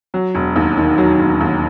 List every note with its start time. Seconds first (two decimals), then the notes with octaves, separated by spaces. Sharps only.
0.14 F#3
0.35 E1
0.56 D#2
0.77 D#3
0.98 F#3
1.19 E1
1.41 D#2